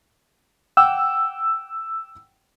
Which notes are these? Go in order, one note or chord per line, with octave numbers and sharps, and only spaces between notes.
F#5 G5 D6 E6